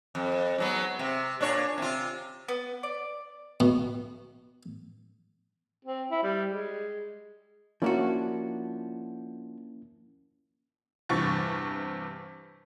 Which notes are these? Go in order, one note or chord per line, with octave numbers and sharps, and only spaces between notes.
F2
G#2 F#3 B3
C3
A#2 D4 C#5
C3 F4
B3
D5
B2
C4
E4
G3
G#3
F3 A#3 C#4 D4 E4 F#4
E2 G2 C3 C#6 A6